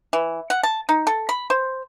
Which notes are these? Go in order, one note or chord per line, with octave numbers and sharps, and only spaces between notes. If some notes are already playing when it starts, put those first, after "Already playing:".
E3
F#5
A5
D#4
A4
B5
C5